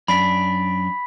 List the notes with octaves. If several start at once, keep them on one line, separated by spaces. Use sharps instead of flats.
F#2 D4 B5 B6